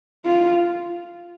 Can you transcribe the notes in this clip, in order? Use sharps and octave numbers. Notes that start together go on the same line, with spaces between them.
F4